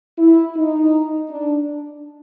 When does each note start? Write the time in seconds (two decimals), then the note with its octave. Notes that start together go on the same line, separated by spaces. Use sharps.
0.18 E4
0.55 D#4
1.30 D4